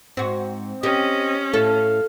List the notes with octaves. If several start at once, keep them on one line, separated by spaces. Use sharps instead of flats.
G#2 C4 F#4
C#4 G4 D#5
A2 A4 F5